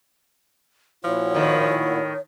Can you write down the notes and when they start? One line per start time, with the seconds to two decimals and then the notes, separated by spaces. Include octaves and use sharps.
1.04 A#2 F3 E4 F#4 C#5
1.35 A2 D#3